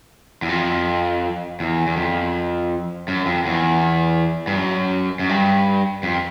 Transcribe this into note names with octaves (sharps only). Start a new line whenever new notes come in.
E2
F2
E2
E2
F2
F#2
F2
E2
G2
F#2
F#2
G2
F2